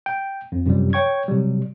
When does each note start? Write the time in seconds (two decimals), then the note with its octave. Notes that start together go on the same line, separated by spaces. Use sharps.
0.06 G5
0.52 F2
0.66 F#2 C3 F3 G3
0.93 C#5 G5 C#6 G#6
1.28 C3 F#3 G3